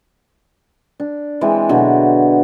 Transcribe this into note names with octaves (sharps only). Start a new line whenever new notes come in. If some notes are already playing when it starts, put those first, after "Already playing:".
D4
E3 G#3 C4 D4
B2 D3 F#3